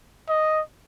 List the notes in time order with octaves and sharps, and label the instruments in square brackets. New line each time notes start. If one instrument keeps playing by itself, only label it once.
[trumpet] D#5